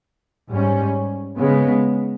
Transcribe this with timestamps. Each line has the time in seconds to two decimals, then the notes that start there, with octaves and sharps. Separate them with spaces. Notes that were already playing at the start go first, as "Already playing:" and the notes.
0.50 G#2 G3 C#4
1.38 C#3 G#3 B3